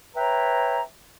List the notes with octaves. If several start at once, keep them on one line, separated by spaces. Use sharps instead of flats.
B4 C#5 E5 G5 A#5